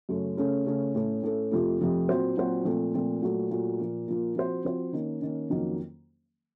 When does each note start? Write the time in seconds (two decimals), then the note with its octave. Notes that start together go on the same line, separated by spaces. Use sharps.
0.09 F#2 C#3 A3 C#4
0.37 C#3 A3 C#4
0.66 C#3 A3 C#4
0.95 A2 A3 C#4 A4
1.22 A2 A3 C#4 A4
1.51 F2 C3 F3 A3
1.80 F2 C3 F3 A3
2.09 A#2 F#3 C4 F#4 C5
2.37 A#2 F#3 C4 F#4 C5
2.65 A#2 F3 A3 C4
2.94 A#2 F3 A3 C4
3.22 A#2 F#3 A3
3.51 A#2 F#3 A3
3.79 A#2 F3 A#3
4.08 A#2 F3 A#3
4.36 F3 C4 F#4 C5
4.64 F3 C4 F#4 C5
4.93 D#3 A#3 C#4
5.22 D#3 A#3 C#4
5.50 F2 D#3 F#3 A#3 C#4